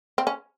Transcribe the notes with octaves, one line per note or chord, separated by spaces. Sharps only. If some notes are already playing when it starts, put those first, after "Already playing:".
C4
C#4